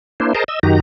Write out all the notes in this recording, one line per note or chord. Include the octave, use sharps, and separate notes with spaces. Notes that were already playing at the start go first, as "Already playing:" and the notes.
A#3 D4 E4 C5
G#4 A#4 C5 D#5 A5 A#5
D#5 E6
F#2 D#3 D#4 F#4 G4 A#5